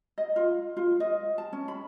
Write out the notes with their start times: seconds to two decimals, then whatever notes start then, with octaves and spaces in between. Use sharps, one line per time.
0.18 D#5
0.36 F4
0.77 F4
1.00 D#5
1.38 A5
1.53 C#4
1.68 B5